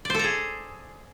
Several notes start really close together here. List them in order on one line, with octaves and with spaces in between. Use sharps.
D5 C5 A4 A#5 G#4